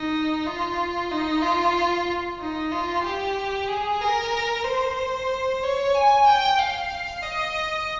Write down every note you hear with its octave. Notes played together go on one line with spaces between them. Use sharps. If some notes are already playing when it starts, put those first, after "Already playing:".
Already playing: D#4
F4
D#4
F4
D#4
F4
G4
G#4
A#4
C5
C#5
G#5
G5
F5
D#5